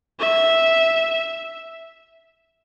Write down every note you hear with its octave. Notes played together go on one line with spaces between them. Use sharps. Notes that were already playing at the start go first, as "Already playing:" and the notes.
E5